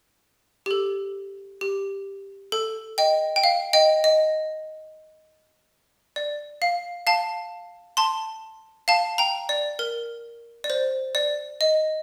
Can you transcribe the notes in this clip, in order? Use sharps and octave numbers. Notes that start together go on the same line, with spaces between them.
G4
A4
G4
A4
D#5 G5
G5
F5
D#5 G5
D#5
D5
F5
F5 A5
A5 C6
F5 A5
G5 A#5
D5
A#4
D5
C5
D5
D#5